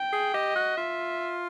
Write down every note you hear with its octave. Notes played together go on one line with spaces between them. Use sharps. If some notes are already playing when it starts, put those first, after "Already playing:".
Already playing: G5
G#4
G4 D#5
F#4
F4 E5